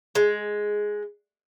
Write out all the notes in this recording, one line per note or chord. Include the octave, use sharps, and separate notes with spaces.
G#3